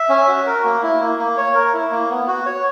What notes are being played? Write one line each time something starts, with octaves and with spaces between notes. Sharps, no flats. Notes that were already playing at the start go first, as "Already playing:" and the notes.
Already playing: E5
C#4
F#4
A#4
A#3
E4
A#3
A#3
C#5
A#4
E4
A#3
B3
F#4
C#5